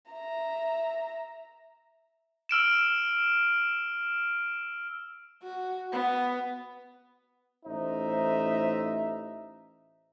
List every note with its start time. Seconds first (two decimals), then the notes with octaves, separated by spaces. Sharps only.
0.12 E5 A#5
2.49 E6 F6 D7 E7
5.43 F#4
5.92 B3
7.66 A1 D#4 C5 E5